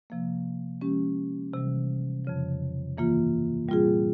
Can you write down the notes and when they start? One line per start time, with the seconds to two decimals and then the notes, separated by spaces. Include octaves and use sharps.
0.10 C3 F3 A#3
0.81 F3 G#3 C#4 G4
1.53 C3 E3 G3
2.25 F2 C#3 F3
2.97 G2 E3 A#3 F4
3.68 A#2 G3 C4 F4 G#4